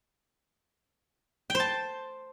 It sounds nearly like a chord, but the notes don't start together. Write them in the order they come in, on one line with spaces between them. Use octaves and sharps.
G5 C5 A5